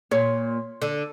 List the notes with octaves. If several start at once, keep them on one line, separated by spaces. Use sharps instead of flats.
A#2 C#5
D3